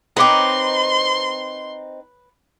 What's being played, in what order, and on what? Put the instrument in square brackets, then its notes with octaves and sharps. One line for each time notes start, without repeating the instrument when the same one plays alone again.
[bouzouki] C4 D#4 [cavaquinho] B4 C#5 D6 [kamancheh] C6